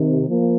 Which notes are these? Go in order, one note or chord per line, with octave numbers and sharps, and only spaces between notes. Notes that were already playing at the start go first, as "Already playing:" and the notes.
Already playing: C3 D#3
F3 A#3